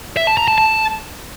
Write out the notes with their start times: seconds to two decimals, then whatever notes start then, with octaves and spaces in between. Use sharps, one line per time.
0.17 E5
0.27 A5
0.37 A#5
0.48 A5
0.58 A5